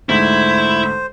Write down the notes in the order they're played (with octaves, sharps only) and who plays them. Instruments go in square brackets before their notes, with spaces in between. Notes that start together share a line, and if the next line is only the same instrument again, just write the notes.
[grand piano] D2 G#2 [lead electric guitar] E4 [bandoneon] C5